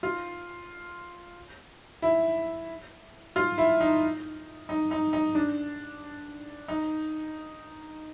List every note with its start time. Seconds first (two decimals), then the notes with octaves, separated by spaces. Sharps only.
0.03 F4
2.02 E4
3.36 F4
3.58 E4
3.81 D#4
4.69 D#4
4.91 D#4
5.13 D#4
5.35 D4
6.68 D#4